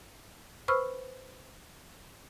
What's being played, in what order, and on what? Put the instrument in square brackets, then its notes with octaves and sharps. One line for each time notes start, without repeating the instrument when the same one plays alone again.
[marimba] B4 C5 B5 C#6 E6 F6